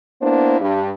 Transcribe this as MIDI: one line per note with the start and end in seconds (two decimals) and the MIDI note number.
0.22 0.56 58
0.22 0.56 59
0.22 0.56 62
0.22 0.56 64
0.22 0.56 72
0.60 0.90 43